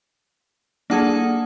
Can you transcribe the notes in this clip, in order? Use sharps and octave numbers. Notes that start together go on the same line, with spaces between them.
A#3 D4 G#4 A4 F#5